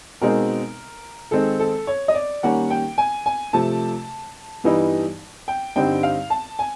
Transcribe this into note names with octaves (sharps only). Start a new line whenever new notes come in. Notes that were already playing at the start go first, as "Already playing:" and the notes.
B2 G#3 C4 D#4 A#4
D#3 G#3 C4 D#4 A4
A4
C#5
D#5
D5
D#3 G3 A#3 C#4 F#5
G5
G#5
G#5
C3 F3 A3 A5
G2 E3 G3 B3 D#4
G5
G2 D3 G3 C4 D#4 G5
F5
A5
G#5